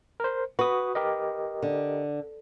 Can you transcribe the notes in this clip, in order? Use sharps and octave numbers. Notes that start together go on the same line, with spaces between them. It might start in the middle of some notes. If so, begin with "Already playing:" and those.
A#4 C5
F#4 B4 D#6
G4 A#4 D#5
D3